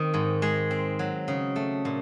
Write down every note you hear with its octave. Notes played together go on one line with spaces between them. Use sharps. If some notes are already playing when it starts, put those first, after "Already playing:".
Already playing: D#3 C4
G#2
G#3
C4
F#3
C#3
A3
A#2